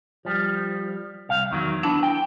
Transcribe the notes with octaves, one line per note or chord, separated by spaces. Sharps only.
F3 G3
C2 F5
E2 D#3 F#3
B3 D4 E4 A5
G5